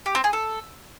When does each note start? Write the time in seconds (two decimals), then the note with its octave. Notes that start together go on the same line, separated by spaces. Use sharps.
0.06 G4
0.15 C4
0.24 G#4
0.33 A4